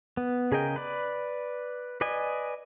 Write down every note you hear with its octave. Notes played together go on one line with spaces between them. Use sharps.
B3
C#3 G#4 A#4 D#5 G5
B4 D5
B4 D5 D#5 G#5